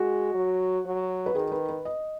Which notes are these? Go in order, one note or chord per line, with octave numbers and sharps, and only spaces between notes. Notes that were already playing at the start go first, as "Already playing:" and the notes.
Already playing: G#3 F#4
F#3
F#3
B4
D#3 G#4
B4
B4
D#5